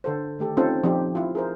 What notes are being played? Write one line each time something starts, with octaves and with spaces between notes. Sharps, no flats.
D3 A4 C5
D#3 A3 G4 A4
C4 C#4 D#4 F4 A4 C5
F3 C4 D#4 G4
F3 E4 F4
G#4 A#4 C5